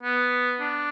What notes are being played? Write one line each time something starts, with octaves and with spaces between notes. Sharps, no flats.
B3
D4